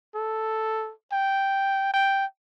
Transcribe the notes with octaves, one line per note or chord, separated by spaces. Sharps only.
A4
G5
G5